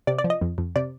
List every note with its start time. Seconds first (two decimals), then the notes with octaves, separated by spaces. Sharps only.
0.07 C3 D5
0.19 D5
0.24 F3
0.30 D#5
0.41 F2
0.58 F2
0.76 C3 D5